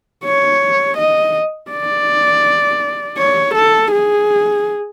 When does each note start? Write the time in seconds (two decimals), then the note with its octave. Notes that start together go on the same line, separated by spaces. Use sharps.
0.24 C#5
0.98 D#5
1.71 D5
3.18 C#5
3.54 A4
3.91 G#4